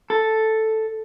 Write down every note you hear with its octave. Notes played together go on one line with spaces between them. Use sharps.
A4